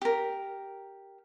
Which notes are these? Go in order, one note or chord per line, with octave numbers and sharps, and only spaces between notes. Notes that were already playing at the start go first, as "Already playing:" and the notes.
G4 A#4